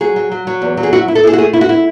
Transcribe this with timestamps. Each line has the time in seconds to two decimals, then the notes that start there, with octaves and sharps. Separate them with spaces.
0.01 F#3 G#4
0.16 F#3
0.32 F#3
0.47 F#3
0.62 E2
0.77 F#3
0.83 G#4
0.93 E4 F#4
1.08 E4
1.15 A4
1.23 E4 G#4
1.33 F#4
1.38 A3 G#4
1.53 E4
1.61 F#4
1.69 E4